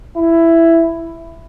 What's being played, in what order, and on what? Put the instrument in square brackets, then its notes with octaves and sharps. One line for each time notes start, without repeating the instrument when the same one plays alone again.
[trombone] E4